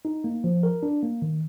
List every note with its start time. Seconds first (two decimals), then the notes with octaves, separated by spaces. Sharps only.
0.05 D#4
0.24 A#3
0.44 F3
0.63 A#4
0.83 D4
1.03 A#3
1.22 D#3